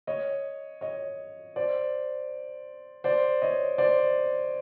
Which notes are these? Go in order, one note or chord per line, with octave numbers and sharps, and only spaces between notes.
C#5 D#5
C#5 D#5
C5 D5
C5 D5
C#5 D#5
C5 D5